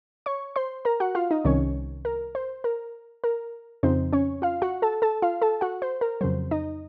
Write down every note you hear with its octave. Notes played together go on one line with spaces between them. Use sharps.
C#5 C#6
C5 C6
A#4 A#5
F#4 F#5
F4 F5
D#4 D#5
C2 C3 D#3 C#4 C#5
A#4
C5
A#4
A#4
F2 C#3 F3 C4 D#4 C5
C#4 C#5
F4 F5
F#4 F#5
A4 A5
A4 A5
F4 F5
A4 A5
F#4 F#5
C5
A#4
F2 C#3 F#3 C5
D#4 D#5